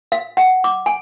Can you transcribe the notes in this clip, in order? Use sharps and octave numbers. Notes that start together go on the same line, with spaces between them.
F5
F#5
D6
G#5